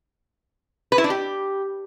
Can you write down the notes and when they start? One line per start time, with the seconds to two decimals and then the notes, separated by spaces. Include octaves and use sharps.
0.92 B4
0.98 E4
1.04 D4
1.10 G4